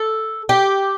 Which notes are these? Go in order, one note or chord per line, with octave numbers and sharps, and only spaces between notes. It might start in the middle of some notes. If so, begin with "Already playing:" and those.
Already playing: A4
G4